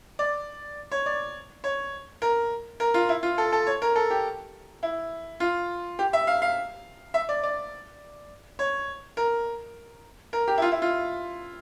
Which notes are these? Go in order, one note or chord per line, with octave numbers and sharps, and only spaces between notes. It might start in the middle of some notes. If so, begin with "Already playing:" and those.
D5
C#5
D5
C#5
A#4
A#4
F4
E4
F4
A4
A4
C#5
A#4
A4
G4
E4
F4
G4
E5
F5
F5
E5
D5
D5
C#5
A#4
A#4
G4
E4
F4
E4
F4